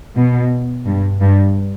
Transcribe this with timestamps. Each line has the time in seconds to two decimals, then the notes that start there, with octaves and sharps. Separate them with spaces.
0.15 B2
0.86 G2
1.21 G2